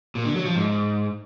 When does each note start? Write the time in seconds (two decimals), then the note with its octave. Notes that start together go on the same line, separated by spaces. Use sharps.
0.15 A#2
0.25 D3
0.35 F#3
0.45 F3
0.56 G#2